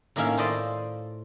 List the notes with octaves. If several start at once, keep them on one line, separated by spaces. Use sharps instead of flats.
A2 D#3 A#3 C#4 E5 F5
F4 A4 C5 D5 D#5 B5